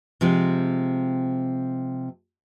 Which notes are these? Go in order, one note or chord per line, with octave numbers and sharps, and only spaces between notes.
C3 F3 G#3 C4